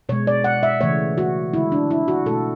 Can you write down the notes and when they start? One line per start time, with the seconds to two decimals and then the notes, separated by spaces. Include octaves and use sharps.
0.09 B2 C#5
0.12 G#3
0.27 D5
0.44 F#5
0.63 E5
0.81 C#3 E3 A3 C#5
1.18 F#4
1.54 D3 G#3 E4
1.72 D4
1.91 E4
2.08 F#4
2.26 B2 A4
2.30 A3